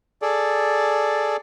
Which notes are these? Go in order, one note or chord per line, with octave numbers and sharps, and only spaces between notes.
G#4 A4 D5